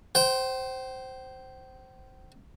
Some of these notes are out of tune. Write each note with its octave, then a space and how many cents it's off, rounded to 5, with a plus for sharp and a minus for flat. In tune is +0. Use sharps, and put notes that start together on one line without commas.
C5 +0 G5 -35